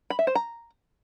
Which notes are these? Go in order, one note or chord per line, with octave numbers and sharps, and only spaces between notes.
B5
E5
C5
A#5